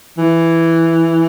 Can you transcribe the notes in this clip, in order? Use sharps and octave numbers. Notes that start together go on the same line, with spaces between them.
E3